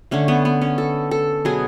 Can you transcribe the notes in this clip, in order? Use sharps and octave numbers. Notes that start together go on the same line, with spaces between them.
D3 A3 C#4
B3
B3
C#4
A4
A4
B2 F#3 B3 G#4